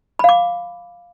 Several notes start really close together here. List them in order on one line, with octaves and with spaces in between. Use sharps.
B5 F5 D6